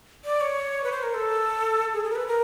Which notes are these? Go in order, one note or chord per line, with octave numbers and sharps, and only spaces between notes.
D5
C#5
B4
C5
A#4
A4
G#4
G#4
A#4
B4
A#4